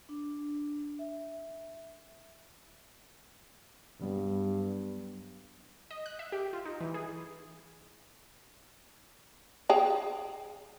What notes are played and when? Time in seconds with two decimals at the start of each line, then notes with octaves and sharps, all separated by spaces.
0.09 D4
0.99 E5
4.01 G2 F#3 G3 B3
5.91 D#5
6.06 F#6
6.19 E5
6.32 G4
6.53 F4
6.66 D#4
6.81 E3
6.94 G#4
9.70 G#4 G5 A#5